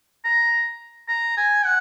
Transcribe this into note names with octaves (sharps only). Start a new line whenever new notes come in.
A#5
A#5
G#5
F#5